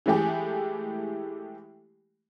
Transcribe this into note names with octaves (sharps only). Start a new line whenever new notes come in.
E3 G#3 A3 G4 G#4